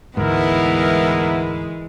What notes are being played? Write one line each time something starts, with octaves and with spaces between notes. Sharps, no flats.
D2 G#2 E3 G#3 B3 E4 A#4